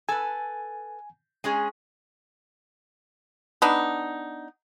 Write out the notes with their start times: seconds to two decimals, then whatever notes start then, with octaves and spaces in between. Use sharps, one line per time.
0.09 A4 B4 G#5
1.44 G#3 C#4 G#4
3.62 B3 D4 D#4